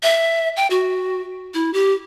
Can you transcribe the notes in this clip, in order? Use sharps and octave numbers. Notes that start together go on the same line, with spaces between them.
E5
G5
F#4
E4
G4